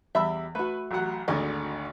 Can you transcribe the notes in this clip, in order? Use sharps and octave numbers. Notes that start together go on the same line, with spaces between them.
E2 G3 E5 B5 E6
A3 F#4 B4
A1 F#3 F#5
G#1 D2 D3 D#5 G#5